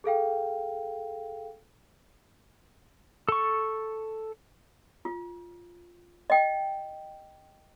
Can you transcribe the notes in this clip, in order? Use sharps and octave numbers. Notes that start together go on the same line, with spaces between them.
G#4 A4 F5 G5
A4 C#6
F4
D#5 G5